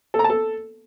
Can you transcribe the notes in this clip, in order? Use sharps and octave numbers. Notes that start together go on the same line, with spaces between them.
A4
A#5
A5
A4